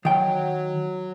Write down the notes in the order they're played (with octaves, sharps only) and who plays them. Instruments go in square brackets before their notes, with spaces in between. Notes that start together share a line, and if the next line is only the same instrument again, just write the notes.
[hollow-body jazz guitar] D#3 G5 [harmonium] F#3